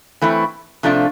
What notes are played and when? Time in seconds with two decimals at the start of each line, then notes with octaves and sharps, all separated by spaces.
0.21 E3 A3 C4 E4
0.83 C3 F3 A3 D4 F4